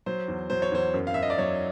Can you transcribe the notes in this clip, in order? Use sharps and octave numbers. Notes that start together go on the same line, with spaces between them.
F#3 C5
E2
F#3 C5
C#5
E2 C5
F#2
F5
F#2 E5
D#5
D5
F#3 C#5